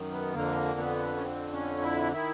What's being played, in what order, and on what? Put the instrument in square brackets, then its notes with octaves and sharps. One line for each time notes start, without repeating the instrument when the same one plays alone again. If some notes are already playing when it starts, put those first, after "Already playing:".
Already playing: [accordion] F#2 D#3
B3
F2 D3 A#3
B3
C#4
C4
C#4
E4
D#3 E4